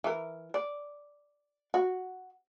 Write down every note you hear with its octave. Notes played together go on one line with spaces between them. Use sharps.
E3 A#4
D5
F#4